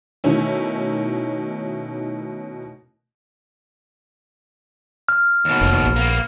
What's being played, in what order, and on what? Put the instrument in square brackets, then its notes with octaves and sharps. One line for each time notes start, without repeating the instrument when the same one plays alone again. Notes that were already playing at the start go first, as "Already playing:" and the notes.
[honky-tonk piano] B2 D#3 A3 C#4 E4
[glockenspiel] F6
[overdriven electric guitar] D#2 B2
[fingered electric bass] F1
A#1
[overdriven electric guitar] A#3 B3